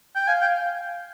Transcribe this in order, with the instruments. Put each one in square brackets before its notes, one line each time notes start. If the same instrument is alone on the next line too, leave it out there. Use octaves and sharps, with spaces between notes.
[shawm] G5
[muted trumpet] F5 [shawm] G#5
[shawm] G5